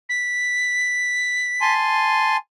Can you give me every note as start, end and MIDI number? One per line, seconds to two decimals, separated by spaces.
0.09 1.74 95
1.61 2.37 80
1.61 2.37 81
1.61 2.37 84